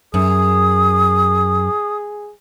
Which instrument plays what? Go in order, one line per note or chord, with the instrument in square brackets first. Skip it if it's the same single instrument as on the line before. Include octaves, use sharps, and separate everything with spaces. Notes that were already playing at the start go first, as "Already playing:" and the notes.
[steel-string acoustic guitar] F#2 [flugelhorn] G#4 [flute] D#6